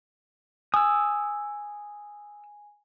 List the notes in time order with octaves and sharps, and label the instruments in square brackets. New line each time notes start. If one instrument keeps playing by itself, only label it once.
[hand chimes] G#5 [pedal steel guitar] D#6 E6